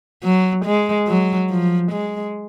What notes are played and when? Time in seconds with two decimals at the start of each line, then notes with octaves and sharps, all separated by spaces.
0.23 F#3
0.65 G#3
1.08 F#3
1.50 F3
1.92 G#3